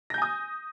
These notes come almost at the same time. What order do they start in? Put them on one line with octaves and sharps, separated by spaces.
A#6 G6 G#5 D#6